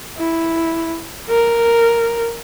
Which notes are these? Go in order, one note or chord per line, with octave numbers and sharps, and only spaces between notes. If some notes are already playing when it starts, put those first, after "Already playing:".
E4
A#4